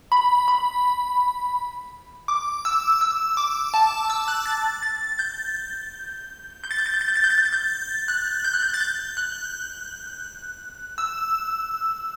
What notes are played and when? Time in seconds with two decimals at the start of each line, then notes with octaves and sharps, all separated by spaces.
0.12 B5
0.48 B5
2.28 D6
2.65 E6
3.01 E6
3.37 D6
3.74 A5
4.10 E6
4.28 F#6
4.46 A6
4.83 A6
5.19 G6
6.64 G6
6.71 A6
6.78 G6
6.86 A6
6.94 G6
7.01 A6
7.08 G6
7.16 A6
7.24 G6
7.30 A6
7.38 G6
7.45 A6
7.53 G6
8.08 F#6
8.44 G6
8.53 F#6
8.62 G6
8.74 A6
8.80 G6
9.17 F#6
10.98 E6